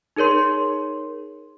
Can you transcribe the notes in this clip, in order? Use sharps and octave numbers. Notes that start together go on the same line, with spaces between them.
D#4 G#4 A#4 C#5 C6